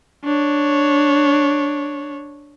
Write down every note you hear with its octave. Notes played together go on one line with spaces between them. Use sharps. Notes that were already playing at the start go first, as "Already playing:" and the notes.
D4 C#5